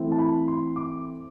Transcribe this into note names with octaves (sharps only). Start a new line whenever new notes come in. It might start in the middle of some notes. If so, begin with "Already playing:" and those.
Already playing: E3 A3 C4 E4
A5
B5
C6
D6